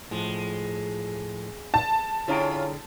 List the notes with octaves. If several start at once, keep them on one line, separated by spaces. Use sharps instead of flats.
A2 F3 G#3
A5
D3 C#4 E4 F4 G#4 C#5 G5 A#5